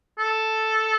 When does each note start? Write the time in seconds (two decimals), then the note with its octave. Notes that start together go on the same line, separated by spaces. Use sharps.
0.18 A4